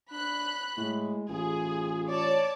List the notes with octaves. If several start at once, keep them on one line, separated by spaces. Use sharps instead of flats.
D4 B5 F#6
A2 G#3
A1 F4 G#4
C#5 D5 A5